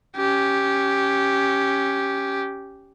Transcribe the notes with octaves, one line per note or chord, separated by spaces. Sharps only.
C#4 G4